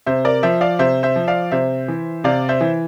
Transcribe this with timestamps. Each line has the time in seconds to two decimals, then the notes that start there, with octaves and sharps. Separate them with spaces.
0.06 C3 C5 E5
0.25 A#4 D5
0.43 F3 C5 E5
0.61 D5 F5
0.79 C3 C5 E5
1.03 C5 E5
1.16 F3
1.28 D5 F5
1.51 C3 C5 E5
1.88 E3
2.24 C3 D5 F5
2.49 C5 E5
2.61 E3